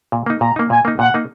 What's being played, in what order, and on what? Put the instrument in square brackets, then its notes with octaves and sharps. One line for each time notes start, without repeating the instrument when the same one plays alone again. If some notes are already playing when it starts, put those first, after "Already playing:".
[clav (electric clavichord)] A#2
A#3 D#4
[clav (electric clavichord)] A#2 [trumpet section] A#5
[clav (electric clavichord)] A#3 D#4
[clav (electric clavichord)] A#2 [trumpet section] G#5
[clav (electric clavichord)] A#3 D#4
[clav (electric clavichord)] A#2 [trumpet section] F#5
[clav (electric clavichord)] A#3 D#4